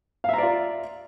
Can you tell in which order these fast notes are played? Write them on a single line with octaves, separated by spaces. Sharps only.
F5 E5 A#5 D5 F4